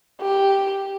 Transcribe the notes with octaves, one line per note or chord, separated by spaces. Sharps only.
G4